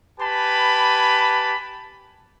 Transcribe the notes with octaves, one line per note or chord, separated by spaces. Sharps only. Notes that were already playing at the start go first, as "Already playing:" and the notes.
G4 B4 G#5 A5 B5